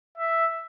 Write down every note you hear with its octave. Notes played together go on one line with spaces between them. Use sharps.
E5